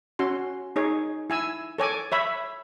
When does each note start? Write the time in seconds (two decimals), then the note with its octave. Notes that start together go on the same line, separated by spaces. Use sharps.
0.19 C#4 F#4 C6
0.76 D#4 G#4 C#5
1.30 E4 G#5 E6
1.78 A4 C#5 G#5 D6
2.12 C#5 E5 B5